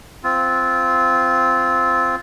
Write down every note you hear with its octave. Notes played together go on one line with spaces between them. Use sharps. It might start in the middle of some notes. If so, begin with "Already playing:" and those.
C4 F4